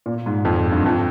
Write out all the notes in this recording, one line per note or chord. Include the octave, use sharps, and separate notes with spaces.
A#2
G#2
F2
G2
F2